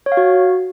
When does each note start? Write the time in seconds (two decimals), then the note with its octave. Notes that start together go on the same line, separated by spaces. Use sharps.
0.06 C#5
0.12 F5
0.17 F#4